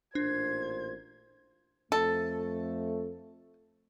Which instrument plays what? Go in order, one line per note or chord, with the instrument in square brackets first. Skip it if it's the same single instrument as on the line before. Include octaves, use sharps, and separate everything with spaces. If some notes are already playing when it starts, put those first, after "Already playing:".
[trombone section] A1 A#2 C5 [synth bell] D4 [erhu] G#6
[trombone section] F2 A3 [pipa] A4